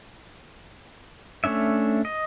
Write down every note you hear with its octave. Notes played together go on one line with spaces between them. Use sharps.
A3 C#4 D4 E5
D#5